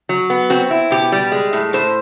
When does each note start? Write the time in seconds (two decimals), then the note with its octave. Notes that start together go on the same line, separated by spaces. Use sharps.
0.09 F#3
0.30 B3
0.50 C4 F#4
0.70 E4
0.91 B2 G4
1.12 G3
1.32 G#3
1.53 A2
1.73 A2 C5